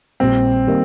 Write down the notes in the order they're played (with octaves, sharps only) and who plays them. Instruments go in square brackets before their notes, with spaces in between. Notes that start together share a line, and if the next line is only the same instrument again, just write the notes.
[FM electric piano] A#1 A#2 G3 [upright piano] C4
[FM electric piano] D#3 G3 A#3 D#4